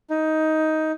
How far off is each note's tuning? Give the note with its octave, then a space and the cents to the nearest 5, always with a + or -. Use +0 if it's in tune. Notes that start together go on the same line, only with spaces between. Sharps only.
D#4 +10